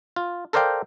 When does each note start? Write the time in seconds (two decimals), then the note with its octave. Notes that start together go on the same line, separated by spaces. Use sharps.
0.16 F4
0.53 A4 A#4 C5 D5 F5 G5